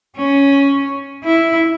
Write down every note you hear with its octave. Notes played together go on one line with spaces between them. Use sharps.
C#4
E4